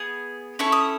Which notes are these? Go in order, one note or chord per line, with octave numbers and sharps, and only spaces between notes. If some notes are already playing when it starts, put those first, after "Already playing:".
Already playing: B3 G#4
C#4 E4 A4 C#6
D#6